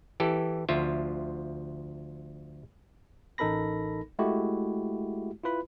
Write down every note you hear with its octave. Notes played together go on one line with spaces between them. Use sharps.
E3 G4 A4
D2 F3 F4 E5
A1 D#4 A4 A#4 B5 A#6
G#3 A3 E4 F#4 G4
E4 F4 B4 B5